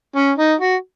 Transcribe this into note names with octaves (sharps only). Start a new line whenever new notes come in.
C#4
D#4
F#4